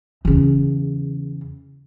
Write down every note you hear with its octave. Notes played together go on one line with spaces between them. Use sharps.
E2 C#3